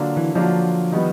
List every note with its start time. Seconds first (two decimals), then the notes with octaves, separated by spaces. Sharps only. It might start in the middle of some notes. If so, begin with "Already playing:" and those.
Already playing: D3 F#3 A#3 D4 F4
0.17 E3
0.35 D3 F3 F#3 A#3 D4 F4
0.92 D#3 G3 B3